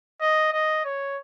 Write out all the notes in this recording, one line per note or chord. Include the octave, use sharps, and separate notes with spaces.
D#5
D#5
C#5